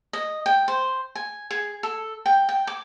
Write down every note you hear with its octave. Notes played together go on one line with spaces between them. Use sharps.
D#5
G5
C5
G#5
G#4
A4
G5
G5
D6